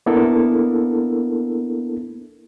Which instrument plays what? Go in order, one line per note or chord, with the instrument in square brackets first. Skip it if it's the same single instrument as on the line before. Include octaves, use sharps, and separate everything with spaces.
[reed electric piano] A#3 B3 D4 E4 A4 A#4